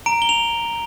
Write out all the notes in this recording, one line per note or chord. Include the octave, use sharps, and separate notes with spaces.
A#5 D7
G7
F7